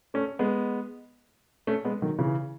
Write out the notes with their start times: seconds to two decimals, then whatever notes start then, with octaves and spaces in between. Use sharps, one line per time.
0.14 A3 C#4
0.39 G#3 B3
1.67 A3 C#4
1.85 G#3 B3
2.02 D#3 F#3
2.19 C#3 E3